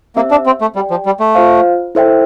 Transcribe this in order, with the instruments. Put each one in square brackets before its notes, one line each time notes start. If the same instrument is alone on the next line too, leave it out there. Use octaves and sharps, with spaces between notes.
[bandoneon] A#3 [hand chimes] C4 G4 C5 E5
[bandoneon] D4
C4
A3
[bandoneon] G3 [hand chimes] G4 D5 G5
[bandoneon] F3
G3
A3
[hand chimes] F4 C5 F5
E4 A4 C5 E5 G5